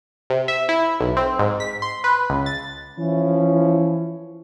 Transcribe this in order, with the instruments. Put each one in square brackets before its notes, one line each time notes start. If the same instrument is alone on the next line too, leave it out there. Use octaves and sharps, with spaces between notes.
[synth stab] C3
E5
E4
B1
C4
G#2
B6
C6
B4
C#2
A6
[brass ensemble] E3 F3 C#4 E4